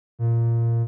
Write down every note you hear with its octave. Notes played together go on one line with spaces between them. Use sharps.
A#2